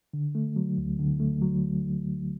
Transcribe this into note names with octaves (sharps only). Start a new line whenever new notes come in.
D3
A3
F#3
D2
D3
A3
F#3